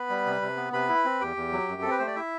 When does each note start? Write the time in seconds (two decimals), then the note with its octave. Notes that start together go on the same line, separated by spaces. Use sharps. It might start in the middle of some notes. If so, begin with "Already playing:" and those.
Already playing: B3 B4 B5
0.10 G3
0.26 C3
0.42 C3
0.57 B3
0.73 C3 B4 B5
0.89 E4
1.05 C4
1.21 E2 G4 G5
1.36 E2
1.52 F#3
1.68 F#2
1.82 C4 A4
1.91 B4
1.99 A3 C5
2.07 D5
2.15 E4 E5